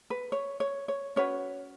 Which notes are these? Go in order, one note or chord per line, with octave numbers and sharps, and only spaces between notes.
B4
C#5
C#5
C#5
C#4 F#4 B4 C#5